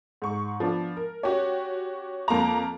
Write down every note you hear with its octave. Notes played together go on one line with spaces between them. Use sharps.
G#2 C#6
F3 B3 D4
A#4
C#4 F#4 G4 C#5
F2 A#3 A5 A#5